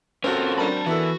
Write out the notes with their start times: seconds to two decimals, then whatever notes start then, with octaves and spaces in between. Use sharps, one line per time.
0.24 C4 C#4 F4 F#4 A4 A#4
0.58 D4 A#4 D5 A5 B5
0.86 E3 B3 E4 F#4 A4